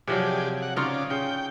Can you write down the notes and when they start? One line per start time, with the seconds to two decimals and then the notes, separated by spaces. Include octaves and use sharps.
0.08 C3 F3 F#3 G4 G#4 D5
0.62 F#5
0.76 C#3 D#4 F4 C#5 D5
1.10 C#3 G5